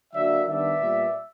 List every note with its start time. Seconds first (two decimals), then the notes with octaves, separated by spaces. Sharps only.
0.14 D3 F#3 A#3 D5 E5
0.47 D#3 G3 B3 D4 D5 E5
0.79 A#2 G3 B3